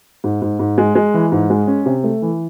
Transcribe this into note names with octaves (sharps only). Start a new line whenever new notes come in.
G#2
G#2
G#2
G#3
G#3
E3
G#2
G#3
C#4
C3
A3
E3